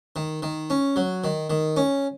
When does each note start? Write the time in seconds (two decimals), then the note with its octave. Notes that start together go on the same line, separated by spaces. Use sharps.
0.16 D#3
0.42 D#3
0.70 C#4
0.96 F#3
1.24 D#3
1.50 D#3
1.76 C#4